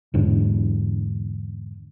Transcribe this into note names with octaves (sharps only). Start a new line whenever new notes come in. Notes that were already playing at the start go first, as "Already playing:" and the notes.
E2 G#2 D3